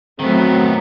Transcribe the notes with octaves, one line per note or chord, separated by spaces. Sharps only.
D#3 F#3 A3 B3 C4